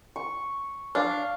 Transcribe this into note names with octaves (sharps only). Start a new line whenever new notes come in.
C#6
D4 F5